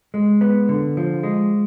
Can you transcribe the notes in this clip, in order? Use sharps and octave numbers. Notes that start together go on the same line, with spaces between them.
G#3
B3
D3
F3
G#3